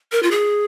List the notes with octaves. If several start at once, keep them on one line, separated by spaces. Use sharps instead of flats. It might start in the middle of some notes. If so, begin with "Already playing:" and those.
A#4
F4
G#4